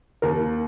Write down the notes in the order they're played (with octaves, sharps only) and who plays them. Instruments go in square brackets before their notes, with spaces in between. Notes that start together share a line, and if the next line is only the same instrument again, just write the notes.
[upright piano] D#2 [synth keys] A#4